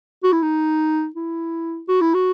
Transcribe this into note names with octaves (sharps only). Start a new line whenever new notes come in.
F#4
E4
D#4
E4
F#4
E4
F#4